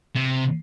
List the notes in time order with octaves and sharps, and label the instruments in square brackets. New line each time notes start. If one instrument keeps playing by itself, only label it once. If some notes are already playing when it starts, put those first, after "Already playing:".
[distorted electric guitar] C3